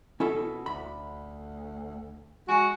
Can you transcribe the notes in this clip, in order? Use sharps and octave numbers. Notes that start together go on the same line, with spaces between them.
B2 C#4 E4 A4
D2 B5
G#3 F#4 G#5 C#7